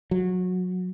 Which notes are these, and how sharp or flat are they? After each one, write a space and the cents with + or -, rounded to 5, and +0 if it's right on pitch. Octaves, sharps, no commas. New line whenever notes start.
F#3 -20